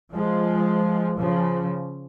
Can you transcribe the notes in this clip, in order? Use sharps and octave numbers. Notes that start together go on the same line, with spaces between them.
F3 G#3
C#3 F3